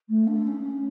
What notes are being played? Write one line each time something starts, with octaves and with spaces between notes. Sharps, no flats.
A3
D4
C#4